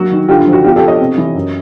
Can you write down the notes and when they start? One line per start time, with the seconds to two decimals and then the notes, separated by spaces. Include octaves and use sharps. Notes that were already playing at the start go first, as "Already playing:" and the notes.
Already playing: F#3 A#3 F#4
0.11 D#3
0.28 D3 F4 G4
0.41 F4
0.47 F3
0.53 F#4
0.64 B2 F4 G4
0.76 G4 A4
0.81 B2
0.88 C#5 D#5
1.00 C3
1.18 E3
1.35 F#2